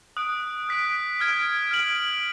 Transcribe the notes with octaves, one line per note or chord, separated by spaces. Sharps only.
D#6 F#6 D7
F#6 B6 D7
F6 G#6 D7
F6 G#6 D7 F#7